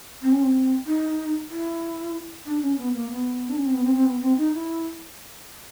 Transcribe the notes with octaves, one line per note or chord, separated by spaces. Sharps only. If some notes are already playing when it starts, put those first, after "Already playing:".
C4
C#4
C4
D#4
E4
D4
C#4
B3
A#3
B3
D4
C#4
C4
B3
C4
C4
B3
C4
D#4
E4